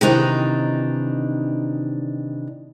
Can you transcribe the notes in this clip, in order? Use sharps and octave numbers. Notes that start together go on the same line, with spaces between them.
C3 D#3 E3 D4 D#4 A#5